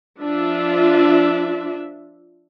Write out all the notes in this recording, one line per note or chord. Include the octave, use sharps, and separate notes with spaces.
F3 D4 F4 E5